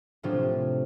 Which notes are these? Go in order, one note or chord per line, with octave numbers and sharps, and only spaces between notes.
A2 C3 F3 F#3 D4 F4